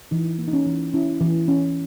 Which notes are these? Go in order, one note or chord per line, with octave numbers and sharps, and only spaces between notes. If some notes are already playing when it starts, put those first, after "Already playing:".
E3 D#4
A#3
D#4
C#4
E3
C#4 E4
E3
C#4